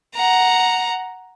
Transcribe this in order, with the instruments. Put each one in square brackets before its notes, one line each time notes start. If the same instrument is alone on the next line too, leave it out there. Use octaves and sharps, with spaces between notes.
[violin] F#5 A#5